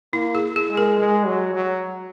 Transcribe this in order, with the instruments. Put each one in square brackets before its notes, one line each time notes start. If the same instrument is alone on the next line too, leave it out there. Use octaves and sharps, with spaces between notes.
[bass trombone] A#3 [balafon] E4
[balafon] G#4
G#4
[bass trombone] G#3
[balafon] A#4
[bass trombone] G#3
F#3
F#3